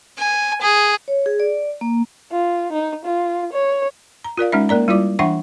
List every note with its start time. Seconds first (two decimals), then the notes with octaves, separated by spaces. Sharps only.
0.18 G#5
0.61 G#4
1.08 C#5
1.26 G#4
1.40 D5
1.81 A#3
2.31 F4
2.72 D#4
3.05 F4
3.53 C#5
4.24 A#5
4.37 F4 A#4 D5 F5
4.52 G#3 C#4 D#4 E5
4.69 A#3 A#4 D5 A#5
4.88 G3 E4 F4 D5 D6
5.19 E3 D4 E5 F#5 G5 C#6